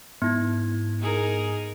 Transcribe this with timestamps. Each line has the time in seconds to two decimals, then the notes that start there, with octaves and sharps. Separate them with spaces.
0.22 G#2 B3 E4 G#6
1.00 D#4 G#4 A#4